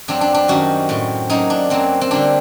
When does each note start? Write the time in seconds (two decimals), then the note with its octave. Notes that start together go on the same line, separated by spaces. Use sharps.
0.08 G2 F#3 C4 D4
0.21 D4
0.34 D4
0.48 F#2 D#3 G3 F#4
0.89 A2 A3 C4
1.30 F#2 F#3 A#3 D#4
1.50 D4
1.70 F#2 F#3 A#3 C4
2.01 C4
2.11 D3 G3 A#3 D4